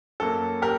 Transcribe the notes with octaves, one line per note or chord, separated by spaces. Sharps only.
F#2 F#3 A#3 A4
G4 A#4